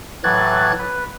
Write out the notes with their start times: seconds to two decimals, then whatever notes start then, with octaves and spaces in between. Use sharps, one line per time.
0.24 A2 E3 F#3 F#6 G#6 A6
0.79 B4